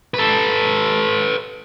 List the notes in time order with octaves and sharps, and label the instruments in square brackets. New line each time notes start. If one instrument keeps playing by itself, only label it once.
[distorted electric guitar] A4 B4